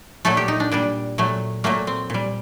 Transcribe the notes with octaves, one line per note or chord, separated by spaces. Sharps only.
A#2 F#3 A3 A4
G4
D#4
D4
A#2 G3 D4
A#2 F#3 A3
A#2 F#3 A3 A#3
C4
A#2 G3